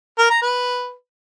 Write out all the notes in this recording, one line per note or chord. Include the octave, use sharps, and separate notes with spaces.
A#4
A#5
B4